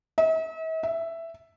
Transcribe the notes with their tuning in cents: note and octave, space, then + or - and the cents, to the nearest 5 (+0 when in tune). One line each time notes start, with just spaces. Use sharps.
E5 -45
E5 +5